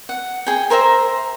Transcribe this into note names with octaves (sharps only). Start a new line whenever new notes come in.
F#5
G#4 G5
A#4 C5 E5 A#5